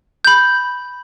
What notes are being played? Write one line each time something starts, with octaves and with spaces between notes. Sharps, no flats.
B5 G6